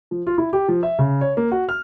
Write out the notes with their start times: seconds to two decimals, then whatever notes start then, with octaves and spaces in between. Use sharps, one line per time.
0.11 F3
0.27 F4
0.38 E4
0.53 G4
0.68 F3
0.83 E5
0.99 C#3
1.21 C#5
1.37 A#3
1.52 F#4
1.69 F6